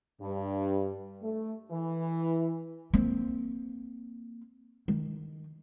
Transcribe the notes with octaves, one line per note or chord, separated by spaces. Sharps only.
G2
A3
E3
A#3 C4
D#3